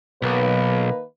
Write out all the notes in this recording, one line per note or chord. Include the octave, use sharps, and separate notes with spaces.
B1 D#3 A#3 B4